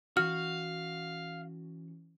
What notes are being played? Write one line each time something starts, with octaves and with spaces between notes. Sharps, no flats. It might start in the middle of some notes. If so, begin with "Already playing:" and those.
E3 C#4 F#4 F5 F6